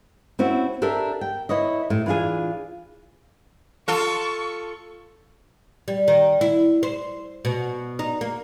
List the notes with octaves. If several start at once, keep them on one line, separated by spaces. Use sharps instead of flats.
C4 C#4 E4 F#4
D4 G4 A4 A#4 E5
G5
E4 B4 C#5 D#5
A2
E3 D4 F4 G#4 G#5
F4 A4 C#6
G3
D#3
E4
C5
B2
D#4
A#3